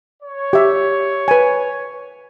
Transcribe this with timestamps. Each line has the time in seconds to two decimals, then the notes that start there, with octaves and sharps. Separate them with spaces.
0.23 C#5
0.53 G4 E5
1.28 B4 G#5